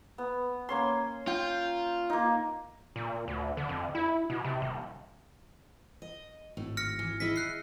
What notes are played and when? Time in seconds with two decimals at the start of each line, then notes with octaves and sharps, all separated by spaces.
0.18 B3
0.69 A#3 C#4 C6
1.27 F4 G5
2.10 A#3 D#4
2.96 A#2
3.28 D2
3.57 D3
3.69 F2
3.95 E4
4.30 B2
4.45 C3
4.62 D#1
6.02 D#5
6.57 G#1 A2
6.77 F6 A#6 C#7
6.99 E3
7.20 E4 G#4 D#5 B6
7.36 F#6 C7